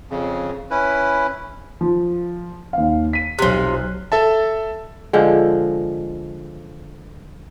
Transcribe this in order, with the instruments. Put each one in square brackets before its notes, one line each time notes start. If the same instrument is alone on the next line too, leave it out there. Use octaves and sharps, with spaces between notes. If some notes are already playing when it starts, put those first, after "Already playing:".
[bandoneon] F2 C#3
C#4 E4 B4
[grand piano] F3
D#2 F5
B6 D#7
[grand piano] B1 F#6 [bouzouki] C3 F3
[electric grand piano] A4 E5 A5
[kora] D3 F3 G#3